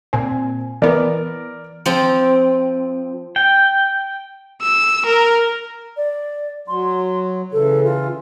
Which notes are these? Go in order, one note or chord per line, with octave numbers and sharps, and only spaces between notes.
A#2 C4 G#5
E3 B3 A#4 D5
F3 C4
G5
E6
A#4
D5
F#3 C6
C#3 E3 A4
F4